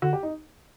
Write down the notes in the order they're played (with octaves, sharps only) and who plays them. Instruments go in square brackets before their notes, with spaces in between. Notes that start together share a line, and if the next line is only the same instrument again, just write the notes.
[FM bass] D3 [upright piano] F#4
[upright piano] G4
D#4